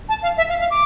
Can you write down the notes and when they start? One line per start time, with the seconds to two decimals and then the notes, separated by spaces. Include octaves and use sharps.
0.08 A5
0.22 F5
0.37 E5
0.48 F5
0.59 F5
0.70 D6